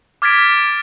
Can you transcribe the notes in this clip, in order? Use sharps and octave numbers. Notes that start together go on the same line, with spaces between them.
D6 F6 G#6 A6 B6 D7